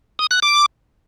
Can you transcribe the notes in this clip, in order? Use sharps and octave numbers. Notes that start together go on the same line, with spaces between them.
D#6
F#6
D6